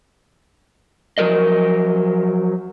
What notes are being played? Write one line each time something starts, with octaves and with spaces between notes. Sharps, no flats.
F3 F#3 A#4 D#5